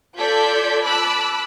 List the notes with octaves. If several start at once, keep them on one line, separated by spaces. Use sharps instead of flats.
F4 A4 D5 G6 G#6 B6
A5 B5 D6 E6 F#6